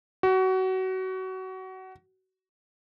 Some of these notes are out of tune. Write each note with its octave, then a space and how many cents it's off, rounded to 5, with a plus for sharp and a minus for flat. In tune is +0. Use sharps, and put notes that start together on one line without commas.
F#4 +25